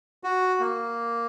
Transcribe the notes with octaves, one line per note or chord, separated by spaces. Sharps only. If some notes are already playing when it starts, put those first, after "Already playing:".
F#4
A#3